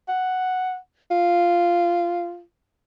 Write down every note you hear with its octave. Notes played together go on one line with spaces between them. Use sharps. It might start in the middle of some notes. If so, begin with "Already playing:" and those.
F#5
F4